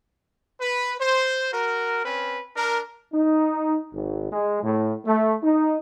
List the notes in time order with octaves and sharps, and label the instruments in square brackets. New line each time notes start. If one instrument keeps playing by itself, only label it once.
[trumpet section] B4
C5
F#4 A#4
C4 C#4 B4
D4 A#4
[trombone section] D#4
G#1
G#3
A2
A3
D#4